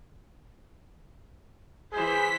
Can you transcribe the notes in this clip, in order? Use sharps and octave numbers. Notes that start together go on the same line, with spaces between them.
E3 G#4 C5 B6